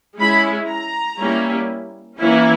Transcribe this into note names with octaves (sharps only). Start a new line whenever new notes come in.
G#3 C#4 E4 B5
A#5
G3 A#3 C#4 E4
E3 A#3 C#4 E4